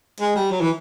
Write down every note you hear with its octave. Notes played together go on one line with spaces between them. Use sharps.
G#3
G3
F#3
E3